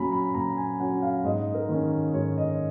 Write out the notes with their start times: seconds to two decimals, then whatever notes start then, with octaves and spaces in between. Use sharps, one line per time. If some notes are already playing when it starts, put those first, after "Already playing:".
Already playing: A#2 F#3 C#4 G#5 A#5 B5
0.12 B5
0.35 A#2 A#5
0.57 G#5
0.80 F#3 C#4 F#5
1.02 F5
1.24 G#2 D#5
1.55 A#4
1.69 D#3 A#3 C#4
2.14 G#2 C#5
2.37 D#5